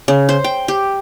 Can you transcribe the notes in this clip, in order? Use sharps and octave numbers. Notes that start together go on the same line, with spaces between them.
C#3
C5
G5
G4